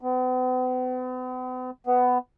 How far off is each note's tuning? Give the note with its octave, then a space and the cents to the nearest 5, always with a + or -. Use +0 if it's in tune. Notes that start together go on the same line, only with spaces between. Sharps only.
B3 +45
B3 +15